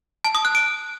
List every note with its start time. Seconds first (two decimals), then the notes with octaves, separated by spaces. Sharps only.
0.25 A5
0.35 D#6
0.45 F#6
0.55 D7